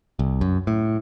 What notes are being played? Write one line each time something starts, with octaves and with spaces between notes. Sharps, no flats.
C2
F#2
A2